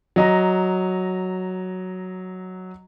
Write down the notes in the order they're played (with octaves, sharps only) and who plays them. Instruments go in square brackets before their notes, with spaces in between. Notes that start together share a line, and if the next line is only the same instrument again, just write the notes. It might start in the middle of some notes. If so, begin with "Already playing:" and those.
[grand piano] F#3 D#5 A#5